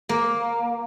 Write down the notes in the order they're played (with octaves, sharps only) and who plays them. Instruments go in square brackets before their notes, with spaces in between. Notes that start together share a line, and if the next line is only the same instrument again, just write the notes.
[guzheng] A#3